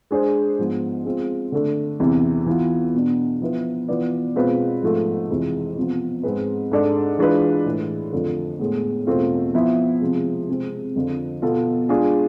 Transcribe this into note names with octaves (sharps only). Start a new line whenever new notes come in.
G#3 D4 G#4 C5
G#2 F3 B3
G#3 C4 F4
D3 A3 D4
E2 C3 E3
E3 B3 F4
B2 B3 D4
F3 B3 E4 B4
E3 B3 F4 B4 D5
B2 G#3 C4 F4 B4
G#2 F3 A3
F2 C3 E3 G#3
C3 F3 B3
G#2 G#3 C4 G#4 B4
G#2 G#3 D4 A4 D5
E3 G#3 D4 F4 B4
A2 E3 G#3
F2 D3 A3 D4 F4
A2 G#3 B3
E2 B2 A3 C4 F4
F3 B3 E4
C3 F3 G#3
C3 G#3 C4
F2 D3 F3
B2 B3 F4 A4
G#3 D4 F4 G#4